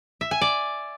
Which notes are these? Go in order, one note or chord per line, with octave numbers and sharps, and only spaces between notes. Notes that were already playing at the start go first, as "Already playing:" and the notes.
E5
G#5
D5